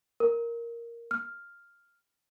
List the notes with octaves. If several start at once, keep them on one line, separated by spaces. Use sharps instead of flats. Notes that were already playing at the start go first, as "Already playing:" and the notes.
A#4
F6